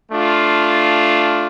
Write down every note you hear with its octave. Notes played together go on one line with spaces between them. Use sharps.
A3 D4 F4